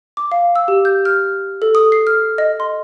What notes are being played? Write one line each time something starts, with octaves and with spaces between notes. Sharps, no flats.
D6
F5
E6
G4
G6
F6
A4
D#6
C7
F6
D#5
C6